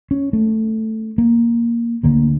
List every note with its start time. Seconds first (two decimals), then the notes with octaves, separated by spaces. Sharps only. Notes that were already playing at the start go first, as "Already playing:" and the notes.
0.11 C#4
0.33 A3
1.18 A#3
2.03 D2 D3 A#3